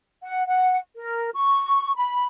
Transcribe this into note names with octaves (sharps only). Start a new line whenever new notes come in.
F#5
F#5
A#4
C#6
B5